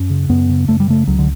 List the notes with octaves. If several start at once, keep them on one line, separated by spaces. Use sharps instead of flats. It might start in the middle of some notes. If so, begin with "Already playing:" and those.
Already playing: F#2 C#4
C#3
F#2 B3
C#3
F#2 A3
G3
C#3 A3
C#2 F#3
D3